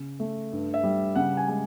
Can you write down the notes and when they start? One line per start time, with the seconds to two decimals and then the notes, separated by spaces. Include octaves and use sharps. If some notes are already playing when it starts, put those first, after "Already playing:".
Already playing: C#3
0.20 A3
0.52 G2
0.74 E5
0.83 G3
1.16 C#3 F#5
1.37 G#5
1.48 G#3 G#5